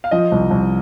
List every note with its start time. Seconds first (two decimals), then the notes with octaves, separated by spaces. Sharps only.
0.04 F5
0.11 F3 D#5
0.32 C2
0.51 C2